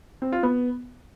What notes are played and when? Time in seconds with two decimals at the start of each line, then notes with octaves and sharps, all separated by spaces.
0.22 C4
0.32 F4
0.43 B3